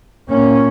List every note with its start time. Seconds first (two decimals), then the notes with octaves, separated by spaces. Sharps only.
0.29 A#2 A#3 C#4